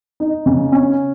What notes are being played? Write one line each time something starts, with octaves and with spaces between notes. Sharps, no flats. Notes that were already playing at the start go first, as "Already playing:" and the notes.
D#4
C#3
C#4